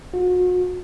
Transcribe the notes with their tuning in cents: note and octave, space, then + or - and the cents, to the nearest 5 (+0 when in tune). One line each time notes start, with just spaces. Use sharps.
F#4 -40